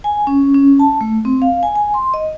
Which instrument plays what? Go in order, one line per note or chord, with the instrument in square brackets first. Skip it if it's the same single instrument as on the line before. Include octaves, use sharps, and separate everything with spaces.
[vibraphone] G#5
C#4
C#4
A5
A3
C4
F5
G#5
G#5
C6
D#5